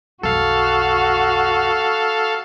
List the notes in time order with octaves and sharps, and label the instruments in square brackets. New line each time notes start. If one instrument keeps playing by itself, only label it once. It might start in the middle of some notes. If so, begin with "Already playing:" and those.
[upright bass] B1 F2 [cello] F#4 [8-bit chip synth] A4 F5